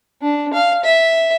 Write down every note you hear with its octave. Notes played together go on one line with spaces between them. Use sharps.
D4
F5
E5